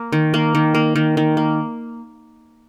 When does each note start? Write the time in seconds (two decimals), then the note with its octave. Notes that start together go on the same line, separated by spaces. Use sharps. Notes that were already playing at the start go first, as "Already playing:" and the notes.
Already playing: A#3
0.12 D#3
0.34 A#3
0.55 D#3
0.75 A#3
0.95 D#3
1.17 D#3
1.37 A#3